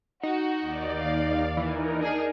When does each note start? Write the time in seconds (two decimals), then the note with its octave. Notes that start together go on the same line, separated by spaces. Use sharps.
0.23 D#4 F#4
0.61 D#2 D5
0.98 F5
1.57 E3 D#4 A#4
1.98 D4 G#4